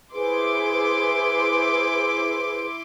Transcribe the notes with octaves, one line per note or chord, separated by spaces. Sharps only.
E4 G#4 B4 C5 C6 D6